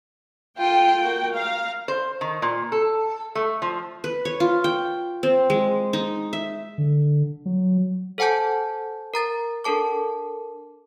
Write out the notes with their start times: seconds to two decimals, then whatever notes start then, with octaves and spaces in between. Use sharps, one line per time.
0.59 F4 A4 G5
1.03 A#3 F#4
1.35 F5 A#5
1.88 C5
2.21 D#3
2.42 A#2
2.72 A4
3.35 A3
3.62 F3
4.04 B4
4.25 C#5
4.40 F4
4.64 G5
5.23 C4
5.50 G#3
5.93 D#4
6.33 E5
6.78 D3
7.46 F#3
8.18 A4 C5 F#5 G#5 A5 G6
9.14 A#4 A#5 A6
9.64 D4 A4 A#4 A5 D6